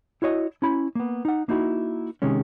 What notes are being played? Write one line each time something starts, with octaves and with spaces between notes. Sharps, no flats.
E4 F#4 C#5 D#5
C#4 E4 B5
A#3 B3
D#4 F#5
A#3 D#4 E4 F#4
C3 D#3 G#3 C#4